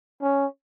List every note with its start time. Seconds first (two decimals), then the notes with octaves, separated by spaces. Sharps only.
0.22 C#4